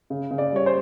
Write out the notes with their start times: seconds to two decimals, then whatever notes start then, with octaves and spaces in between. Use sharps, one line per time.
0.10 C#3
0.31 C#3
0.38 D5
0.53 G3 C#5
0.66 C5